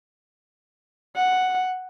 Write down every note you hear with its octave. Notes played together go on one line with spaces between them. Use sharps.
F#5